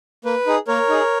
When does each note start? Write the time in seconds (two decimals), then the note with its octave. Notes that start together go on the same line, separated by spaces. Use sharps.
0.25 A#3 B4
0.47 D#4 G#4
0.67 A#3 A#4 C#5
0.89 D#4 G#4